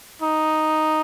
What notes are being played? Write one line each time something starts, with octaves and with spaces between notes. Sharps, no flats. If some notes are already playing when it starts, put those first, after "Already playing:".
D#4